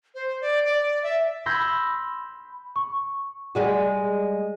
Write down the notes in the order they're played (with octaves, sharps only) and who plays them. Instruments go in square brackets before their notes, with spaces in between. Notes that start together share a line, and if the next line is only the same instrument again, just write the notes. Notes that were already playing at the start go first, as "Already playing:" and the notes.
[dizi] C5
D5
D5
E5
[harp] B5 C6 E6 G6 G#6 A#6
[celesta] C#6
[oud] G3 G#3 F#4